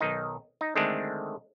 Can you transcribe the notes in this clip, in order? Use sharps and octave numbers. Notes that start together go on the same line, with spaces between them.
B1 D#3 D#4
D#4
D3 D#3 G#3 A3 C4 D4